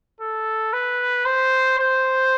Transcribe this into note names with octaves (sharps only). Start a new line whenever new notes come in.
A4
B4
C5
C5